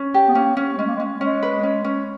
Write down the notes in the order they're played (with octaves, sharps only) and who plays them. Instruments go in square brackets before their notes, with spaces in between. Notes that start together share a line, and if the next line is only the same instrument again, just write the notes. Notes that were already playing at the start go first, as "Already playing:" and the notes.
Already playing: [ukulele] C#4
G4
[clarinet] B3
[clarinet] A#3 [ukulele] C#4
[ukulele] C#4
[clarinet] G#3 [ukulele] C#4
[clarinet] A#3
G#3
[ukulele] C#4
[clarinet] G#3 [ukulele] C#4
[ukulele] B4
C#4
C#4